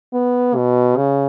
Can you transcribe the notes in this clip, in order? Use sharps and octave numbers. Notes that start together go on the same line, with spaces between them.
B3
B2
C#3